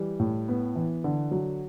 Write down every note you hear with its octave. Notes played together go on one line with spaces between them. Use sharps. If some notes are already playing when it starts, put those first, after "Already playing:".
Already playing: E3 G3
A2
B3
E3
D3
F#3